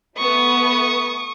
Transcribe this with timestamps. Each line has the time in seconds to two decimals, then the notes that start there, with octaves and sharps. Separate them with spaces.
0.18 A3 B3 C#6 D#6